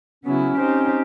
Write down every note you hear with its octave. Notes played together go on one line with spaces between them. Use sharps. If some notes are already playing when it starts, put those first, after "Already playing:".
C#3 F#3 B3 C#4 E4
C4 D#4 G4 C5